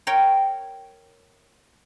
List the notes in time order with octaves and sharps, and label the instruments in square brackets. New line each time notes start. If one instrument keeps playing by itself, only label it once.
[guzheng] A#4 C#5 G5